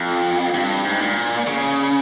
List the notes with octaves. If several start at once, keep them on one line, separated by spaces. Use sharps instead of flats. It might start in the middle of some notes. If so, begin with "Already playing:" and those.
Already playing: F2
G2
G#2
A#2
C#3